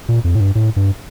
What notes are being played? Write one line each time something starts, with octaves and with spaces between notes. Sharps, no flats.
A#2
F2
A2
G2
A2
G2